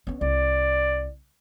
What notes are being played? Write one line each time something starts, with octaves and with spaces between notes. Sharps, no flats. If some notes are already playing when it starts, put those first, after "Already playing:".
B3 C#4
C2 D5